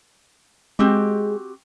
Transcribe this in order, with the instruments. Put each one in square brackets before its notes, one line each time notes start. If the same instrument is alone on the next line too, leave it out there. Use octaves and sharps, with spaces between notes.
[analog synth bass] G#3 [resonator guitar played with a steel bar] C4 F#4 G4